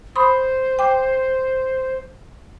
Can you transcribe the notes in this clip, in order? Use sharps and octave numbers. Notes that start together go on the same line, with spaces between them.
C5 B5 C6 D#6
G5 D6